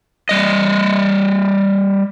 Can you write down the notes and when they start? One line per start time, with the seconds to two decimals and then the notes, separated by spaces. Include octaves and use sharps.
0.29 G3 D#5